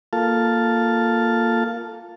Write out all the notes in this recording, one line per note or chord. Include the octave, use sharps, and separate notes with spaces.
A#3 F4 A4 F5 A5